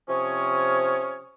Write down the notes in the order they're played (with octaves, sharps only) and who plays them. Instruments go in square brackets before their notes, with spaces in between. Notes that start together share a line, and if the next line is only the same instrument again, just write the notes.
[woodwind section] C3 F3 C#4 C#5 D#6